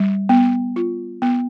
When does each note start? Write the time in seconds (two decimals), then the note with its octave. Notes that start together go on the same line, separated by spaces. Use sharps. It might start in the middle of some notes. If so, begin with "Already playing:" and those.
Already playing: G3
0.29 B3
0.76 F4
1.22 B3